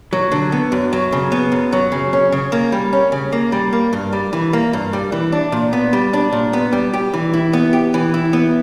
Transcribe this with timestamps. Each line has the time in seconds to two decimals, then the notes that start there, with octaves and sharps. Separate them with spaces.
0.13 F#3
0.32 D3
0.52 B3
0.72 F#2
0.93 F#3
1.12 C#3
1.32 B3
1.52 F#2
1.72 F#3
1.92 C#3
2.13 C#4
2.32 C#3
2.52 A#3
2.72 G3
2.93 C#4
3.12 C#3
3.32 A#3
3.52 G3
3.73 A#3
3.93 G2
4.13 G3
4.33 E3
4.53 A#3
4.73 G2
4.93 G3
5.12 E3
5.32 D4
5.52 A#2
5.73 B3
5.93 G3
6.13 D4
6.33 A#2
6.53 B3
6.73 G3
6.93 G4
7.14 E3
7.33 E4
7.53 B3
7.73 G4
7.94 E3
8.14 E4
8.33 B3